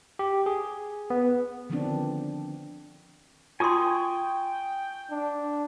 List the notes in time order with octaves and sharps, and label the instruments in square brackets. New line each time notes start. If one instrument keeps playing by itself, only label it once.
[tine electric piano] G4
G#4
B3
[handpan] D3 D#3 F3 B3 C4 D4
[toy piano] F4 C6 [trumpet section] G5 [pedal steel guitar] G#5 C#6 D#6
[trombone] D4